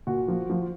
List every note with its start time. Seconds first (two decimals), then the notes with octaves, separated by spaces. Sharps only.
0.07 A#2 F#4
0.28 F3
0.50 F3